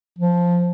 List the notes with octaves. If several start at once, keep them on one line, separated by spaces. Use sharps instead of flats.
F3